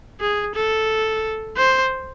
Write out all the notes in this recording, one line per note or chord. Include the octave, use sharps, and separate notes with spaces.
G#4
A4
C5